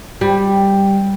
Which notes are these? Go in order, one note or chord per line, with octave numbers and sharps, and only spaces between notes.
G3